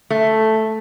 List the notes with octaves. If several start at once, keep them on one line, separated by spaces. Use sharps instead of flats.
A3